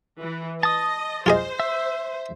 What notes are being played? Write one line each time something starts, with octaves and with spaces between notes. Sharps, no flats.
E3
D#5 A5 D#6
F4 G#4 C5 D#5
E5